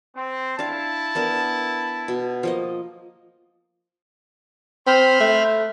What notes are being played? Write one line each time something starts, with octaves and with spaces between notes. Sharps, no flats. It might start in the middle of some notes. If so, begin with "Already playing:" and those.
C4
D4 E4 F5 A5
B3 D4 A#4
B2
F3 A#3 D#5
C4 C5 B5 F6
A3